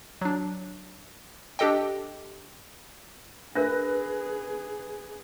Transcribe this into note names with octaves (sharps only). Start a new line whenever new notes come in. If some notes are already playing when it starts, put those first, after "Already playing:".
F#3 D4
D4 G4 A4 D#5 G5
D4 G#4 A#4 B4 F#6 A#6